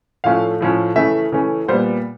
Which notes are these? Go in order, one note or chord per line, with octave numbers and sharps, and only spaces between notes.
A2 F3 A3 C#4 F5
A2 F3 A3 C#4
C#3 E3 A3 C#4 E5
C#3 E3 A3 C#4
A#2 G3 B3 C5